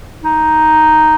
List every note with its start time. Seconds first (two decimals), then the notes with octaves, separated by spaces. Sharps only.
0.24 D#4